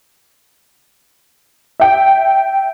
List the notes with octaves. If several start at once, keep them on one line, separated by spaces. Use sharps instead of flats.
E5 G5